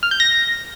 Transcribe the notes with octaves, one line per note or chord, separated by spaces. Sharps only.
F6
G6
A#6